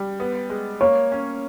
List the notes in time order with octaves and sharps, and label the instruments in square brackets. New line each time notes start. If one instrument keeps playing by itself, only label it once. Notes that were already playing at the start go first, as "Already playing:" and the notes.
Already playing: [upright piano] G3
B3
G#3
[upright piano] A#3 [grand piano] C#5
[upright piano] C#4